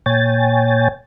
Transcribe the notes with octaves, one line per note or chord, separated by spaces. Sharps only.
A#2 C#5 G5 G#5 A6